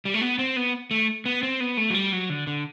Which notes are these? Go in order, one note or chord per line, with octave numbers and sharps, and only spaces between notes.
G3
A3
B3
C4
B3
A3
B3
C4
B3
A3
F#3
G3
F#3
D3
D3